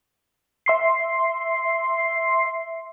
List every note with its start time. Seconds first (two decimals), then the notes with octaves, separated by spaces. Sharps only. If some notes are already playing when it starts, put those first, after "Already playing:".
0.66 E5 C6 C7